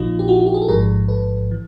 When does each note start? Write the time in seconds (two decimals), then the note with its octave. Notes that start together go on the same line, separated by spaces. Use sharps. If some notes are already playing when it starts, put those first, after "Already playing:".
Already playing: A#1 A#2 F3 D#4 F4
0.19 G4
0.28 E4 F#4
0.39 F#4
0.46 G4
0.54 G#4
0.62 A4
0.68 A1 G#2 F3 G#4 A#4
1.08 A4 B4
1.51 E3